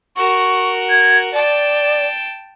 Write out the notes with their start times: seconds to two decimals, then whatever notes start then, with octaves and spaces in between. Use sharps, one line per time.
0.16 F#4 A#4 C#6
0.90 G#6
1.33 D5 G5 A5